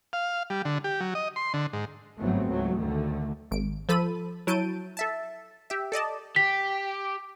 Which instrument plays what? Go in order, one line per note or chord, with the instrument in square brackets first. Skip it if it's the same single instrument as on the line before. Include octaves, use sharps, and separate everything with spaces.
[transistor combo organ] F5
G3
D3
G4
F#3
D#5
C6
D3
G#2
[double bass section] G1 G#2 F#3 A3 B3 C4
C#2 G#2 F#3 A3
D2 D3 D#3 A3
[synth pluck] G#1 D7
F3 A4 B5 D#7
F#3 E4 A5 G6 D7 D#7
A4 E5 A5
G4 E5
A4 D5 D#5 A5
[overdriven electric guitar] G4 [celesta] B6